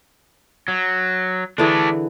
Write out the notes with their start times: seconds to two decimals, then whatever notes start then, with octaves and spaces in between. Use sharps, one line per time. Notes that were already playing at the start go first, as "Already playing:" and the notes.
0.68 F#3
1.58 D3 E3 A3 D4 G#4